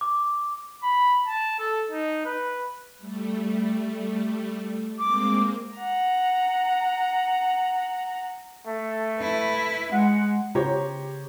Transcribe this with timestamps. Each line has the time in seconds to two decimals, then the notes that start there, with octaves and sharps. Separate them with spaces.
0.01 D6
0.83 B5
1.27 A5
1.59 A4
1.91 D#4
2.25 B4
2.98 G3 A3
4.99 G#3 A#3 C4 D6
5.76 F#5 A#5
8.67 A3
9.20 E4 B4
9.92 G#3 F#5
10.55 C#3 G4 C5 C#5 A#5